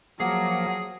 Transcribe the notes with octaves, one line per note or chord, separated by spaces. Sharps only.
F3 F#3 A#3 G#4 F#5